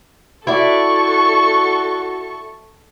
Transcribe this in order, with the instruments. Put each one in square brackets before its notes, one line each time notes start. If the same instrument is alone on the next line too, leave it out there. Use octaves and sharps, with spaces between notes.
[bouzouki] E4 D5 [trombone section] F#4 [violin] A4 C#6